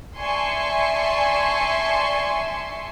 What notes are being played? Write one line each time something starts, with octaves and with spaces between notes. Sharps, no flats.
D5 E5 G#5 A5 C6 C#6